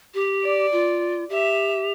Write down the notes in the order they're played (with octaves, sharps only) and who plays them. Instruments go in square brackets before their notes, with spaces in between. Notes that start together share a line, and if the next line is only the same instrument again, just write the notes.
[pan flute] G4
[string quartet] D5
[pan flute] F4
[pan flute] G4 [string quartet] E5